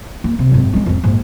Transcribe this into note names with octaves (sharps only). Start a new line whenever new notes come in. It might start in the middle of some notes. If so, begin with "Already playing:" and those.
A#3
C3
G#1 F#2
G#3 C#4
F2 G#2
A#1 G#2